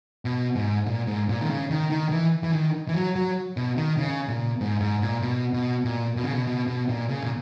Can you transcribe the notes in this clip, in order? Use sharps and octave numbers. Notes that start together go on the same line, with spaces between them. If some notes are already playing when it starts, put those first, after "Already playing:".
B2
G#2
A#2
G#2
A#2
D#3
C#3
D#3
D#3
E3
E3
D#3
E3
F#3
F#3
B2
D#3
C#3
A#2
G#2
G#2
A#2
B2
B2
A#2
B2
C#3
B2
B2
B2
A#2
C#3
A#2